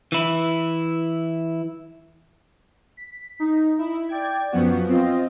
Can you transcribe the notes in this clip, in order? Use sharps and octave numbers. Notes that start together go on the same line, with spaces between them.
E3 E4
B6
D#4
E4
D5 G5 G#6
F#2 F3 B3 F#4
C4 F4 D#5